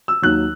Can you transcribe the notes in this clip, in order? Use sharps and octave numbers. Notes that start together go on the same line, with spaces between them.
E6
D#2 D#3 F#3 F#6